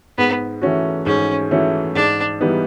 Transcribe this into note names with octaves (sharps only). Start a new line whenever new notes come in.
G#2 B3
E3 A3 C#4 F#4
G#2 C#4
E3 A3 C#4 F#4
G#2 D4
E3 G3 B3 D#4